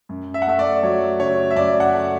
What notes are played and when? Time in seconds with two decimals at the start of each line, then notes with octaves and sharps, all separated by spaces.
0.09 F#2
0.34 E5
0.42 F#5
0.46 A3 E5
0.59 D5
0.83 F#3 C#5
1.20 C#3 C#5
1.51 E5
1.56 F#2 D5
1.80 F#5
1.93 A3